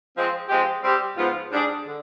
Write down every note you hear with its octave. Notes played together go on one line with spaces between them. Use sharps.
F3 G#3 C4
F3 G#3 C4 G4
G3 C4 G4
G#2 F3 B3 F4
G#2 G3 D4 G#4
D3